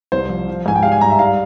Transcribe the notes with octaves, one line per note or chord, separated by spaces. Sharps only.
C2 C5
F3
F3
G#2 G#5
G5
G3 F5
G#5
G2 A#5
E5
G3 F5